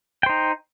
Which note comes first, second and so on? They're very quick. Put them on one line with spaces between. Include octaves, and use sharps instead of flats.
G5 C5 D#4